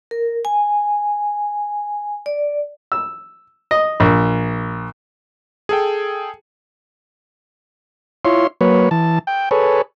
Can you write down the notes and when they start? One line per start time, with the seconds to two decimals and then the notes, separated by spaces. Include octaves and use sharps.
0.11 A#4
0.45 G#5
2.26 D5
2.92 E6
3.71 D#5
4.00 A#1
5.69 G#4 A4 G5
8.25 E4 F4 C#5 C6
8.61 F#3 A#3 B4 C#5
8.91 E3 A5
9.27 G5
9.51 G#4 A4 B4 C#5